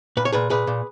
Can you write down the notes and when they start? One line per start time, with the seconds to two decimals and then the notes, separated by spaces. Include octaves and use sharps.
0.17 A#2 B4
0.25 C#5
0.32 A#2 G#4 B4
0.50 A#2 G#4 B4
0.67 A#2